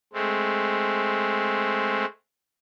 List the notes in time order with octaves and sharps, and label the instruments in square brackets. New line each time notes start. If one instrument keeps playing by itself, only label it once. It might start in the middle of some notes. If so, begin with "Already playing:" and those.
[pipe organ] G#3 A3 C4